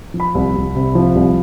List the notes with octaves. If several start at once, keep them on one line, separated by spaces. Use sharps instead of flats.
F3
B5
C2
C2
C3
F3
C2